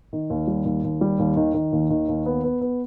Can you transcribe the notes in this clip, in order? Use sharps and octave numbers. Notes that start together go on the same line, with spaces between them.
D#3
D#2
G3
D#2
D#2
G3
D#2
D#3
D#3
D#2
D#3
D#2
B3
B3
B3